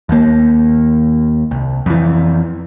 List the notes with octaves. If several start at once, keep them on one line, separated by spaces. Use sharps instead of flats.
D#2 A#3
C2
F2 E3